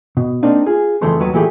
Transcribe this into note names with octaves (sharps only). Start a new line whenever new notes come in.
B2
A#3 C4 D4 D#4
F4 G#4
F2 C#3 E3 A3 C5 C6
D#2 F#3 F#4 B4
A#2 E3 A3 E4 G4 G#4